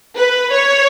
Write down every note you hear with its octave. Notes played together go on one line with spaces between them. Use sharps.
B4
C#5